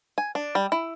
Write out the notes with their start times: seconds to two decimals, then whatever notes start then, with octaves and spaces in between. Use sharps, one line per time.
0.18 G#5
0.35 D4
0.55 G3
0.72 E4